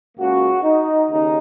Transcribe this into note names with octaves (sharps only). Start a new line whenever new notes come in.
C#2 C#3 A#3 F#4
D#4
D#2 C#3 D#4